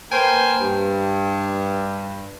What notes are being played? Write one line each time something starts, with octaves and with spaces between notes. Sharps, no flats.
A#3 B4 C5 G5 G#5
G2